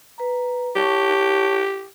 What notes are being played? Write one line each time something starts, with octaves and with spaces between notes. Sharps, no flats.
B4 A#5
G4 C#5 A5 C#6